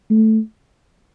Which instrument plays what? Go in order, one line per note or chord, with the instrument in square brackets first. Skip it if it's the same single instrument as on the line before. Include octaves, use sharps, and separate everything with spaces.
[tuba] A3